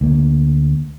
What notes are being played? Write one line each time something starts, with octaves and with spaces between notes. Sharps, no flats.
D2 A#3